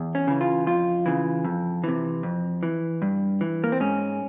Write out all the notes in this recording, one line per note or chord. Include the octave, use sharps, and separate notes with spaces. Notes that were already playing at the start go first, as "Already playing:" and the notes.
Already playing: E2
C#4
C#3 E3
F4
F2 F4
C#3 E3
F2
C3 E3
F2
E3
G2
E3
A#3
C4
G#2 C#4